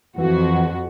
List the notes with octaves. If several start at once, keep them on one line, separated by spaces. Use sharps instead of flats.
F2 E3 F#4